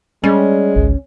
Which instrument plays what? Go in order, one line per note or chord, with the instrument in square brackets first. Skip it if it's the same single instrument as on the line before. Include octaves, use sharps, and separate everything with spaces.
[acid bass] G3 [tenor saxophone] G#3 [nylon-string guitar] C#4
[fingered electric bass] G#1 C#2